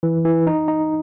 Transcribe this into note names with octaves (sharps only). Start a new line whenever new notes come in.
E3
E3
D#4
D#4